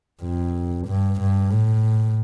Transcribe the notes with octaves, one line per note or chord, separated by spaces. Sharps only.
F2
G2
G2
A2